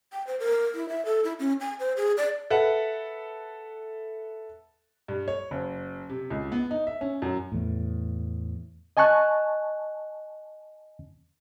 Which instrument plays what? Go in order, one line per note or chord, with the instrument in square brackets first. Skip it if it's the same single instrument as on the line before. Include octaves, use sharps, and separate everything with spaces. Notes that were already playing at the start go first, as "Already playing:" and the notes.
[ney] G5
C5
A#4
E4
E5
A4
E4
C#4
G#5
C5
G#4
D5
[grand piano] A4 B4 E5 F#5
[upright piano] G2
C#5
F#1
C3
C#2
B3
D#4
E5
C#4
F#2
[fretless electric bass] E2 A2
[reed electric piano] D#5 G#5 A5 C#6 F#6